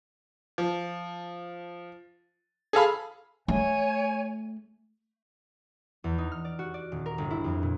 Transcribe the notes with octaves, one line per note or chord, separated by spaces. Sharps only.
F3
G#4 A4 F5 B5
A3 C#5 G#5
E2
D#4
F6
D5
F#4
D5
D#1
A#4
G1
E4
F2
A#2